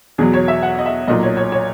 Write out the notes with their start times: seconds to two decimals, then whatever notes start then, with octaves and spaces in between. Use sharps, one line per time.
0.18 E2 B2 F#3 G#4
0.34 C#5
0.48 E5
0.63 F#5
0.79 D#5
0.86 E5
1.08 B1 A#2 F#3 D#5
1.23 C#5
1.37 C#5
1.52 C#5